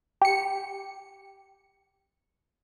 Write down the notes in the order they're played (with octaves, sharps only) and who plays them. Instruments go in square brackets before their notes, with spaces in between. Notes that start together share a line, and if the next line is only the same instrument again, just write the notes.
[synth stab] G4 C#7